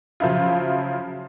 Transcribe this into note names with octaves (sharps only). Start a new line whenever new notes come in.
C#3 F3 F#3 E4 F4